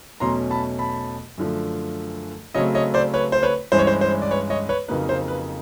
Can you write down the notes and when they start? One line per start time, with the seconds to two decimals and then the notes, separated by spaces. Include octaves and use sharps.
0.20 E2 B2 F#3 A3 C#4 A#5 C6
0.51 A5 B5
0.79 A5 B5
1.38 F#2 D3 F3 A3
2.54 C#3 F#3 A3 C4 C#5 D#5
2.75 C#5 D#5
2.94 C5 D5
3.14 B4 C#5
3.32 C5
3.43 B4 C#5
3.72 G2 E3 G#3 C#4 C5
3.79 C#5
3.87 C5
4.01 C5
4.22 D5
4.31 B4 C#5
4.50 C#5 D#5
4.69 B4 C#5
4.88 F2 C#3 F#3 A#3 D#4 B4
5.09 C5
5.28 B4